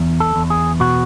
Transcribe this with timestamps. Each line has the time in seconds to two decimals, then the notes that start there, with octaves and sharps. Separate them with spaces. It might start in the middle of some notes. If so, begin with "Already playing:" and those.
Already playing: E2
0.20 A4
0.36 E2
0.50 G#4
0.80 B2 F#4